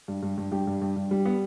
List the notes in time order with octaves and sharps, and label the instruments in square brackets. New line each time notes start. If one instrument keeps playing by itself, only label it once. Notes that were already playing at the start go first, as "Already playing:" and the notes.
[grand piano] G2
G2
G2
G2 G4
G2
G2
G2
G3
B3